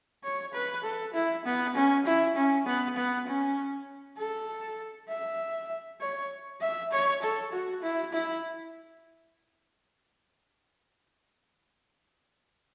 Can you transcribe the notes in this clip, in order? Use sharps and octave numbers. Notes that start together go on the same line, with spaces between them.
C#5
B4
A4
E4
B3
C#4
E4
C#4
B3
B3
C#4
A4
E5
C#5
E5
C#5
A4
F#4
E4
E4